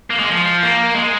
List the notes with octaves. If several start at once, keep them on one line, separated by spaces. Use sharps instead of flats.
A#3
G#3
F3
A#3
G#3